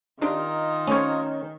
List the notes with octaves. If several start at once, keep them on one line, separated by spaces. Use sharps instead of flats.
D#3 C4 D4 F4 G4 A#4 D#5
A3 C4 C#4 C#5